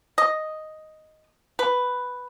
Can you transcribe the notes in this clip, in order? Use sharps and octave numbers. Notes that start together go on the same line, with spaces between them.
D#5
B4